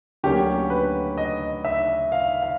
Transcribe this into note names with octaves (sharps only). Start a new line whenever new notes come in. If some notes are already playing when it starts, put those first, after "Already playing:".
D2 D3 F#3 A#3 C#4 G4
B4
D#5
E5
F5
F5